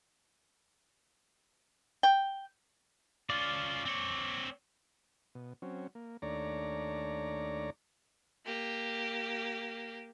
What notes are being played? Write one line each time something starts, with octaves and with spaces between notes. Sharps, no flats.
G5
C#4 F4 D5
C4 C#5
B2
F#3 C4 C#4
A#3
D#2 A3 D4 C#5 D5 A#5
A#3 G4